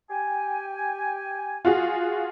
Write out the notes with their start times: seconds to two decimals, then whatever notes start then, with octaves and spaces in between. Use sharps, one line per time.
0.10 G4 G5 G#5
1.65 F4 F#4 G#4